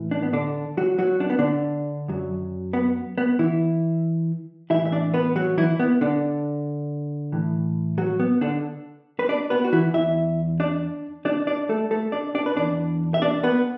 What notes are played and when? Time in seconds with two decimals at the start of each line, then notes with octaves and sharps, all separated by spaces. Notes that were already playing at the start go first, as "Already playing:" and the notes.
Already playing: A2 E3
0.11 D4
0.22 B3
0.33 D3 D4
0.77 F#3 F#4
0.99 F#3 F#4
1.20 D4
1.30 B3
1.39 D3 D4
2.08 F#2 F#3
2.73 B3
3.18 B3
3.39 E3 E4
4.70 A2 E3 E4 E5
4.86 E5
4.92 D4 D5
5.14 B3 B4
5.36 F#3 F#4
5.57 E3 E4
5.80 B3
6.01 D3 D4
7.32 A2 E3
7.98 F#3 F#4
8.20 B3
8.41 D3 D4
9.19 B4
9.29 D4 D5
9.50 B3 B4
9.64 F#4
9.72 E3 E4
9.94 E2 E3 E4 E5
10.60 D4 D5
11.25 D4 D5
11.47 D4 D5
11.69 A3 A4
11.91 A3 A4
12.12 D4 D5
12.35 D4 D5
12.46 B4
12.56 E2 E3 D4 D5
13.14 E5
13.22 D4 D5
13.43 B3 B4